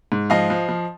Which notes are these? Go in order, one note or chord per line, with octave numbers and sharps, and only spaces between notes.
G#2
F3 D#5 F5
F3
F3